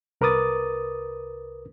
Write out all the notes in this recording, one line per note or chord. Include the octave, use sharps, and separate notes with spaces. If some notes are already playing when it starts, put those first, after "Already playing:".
C2 A#4 B4 D6 D#6 A6